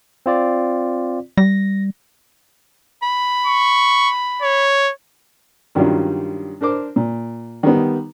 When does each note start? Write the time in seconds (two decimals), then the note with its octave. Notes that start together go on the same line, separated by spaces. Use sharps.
0.26 C4 F4 D5
1.37 G3 A#6
3.02 B5
3.47 C#6
4.42 C#5
5.75 G2 D#3 F#3 G3 C#4 F4
6.61 D4 A#4 C5 D6
6.96 A#2
7.63 D#3 G3 B3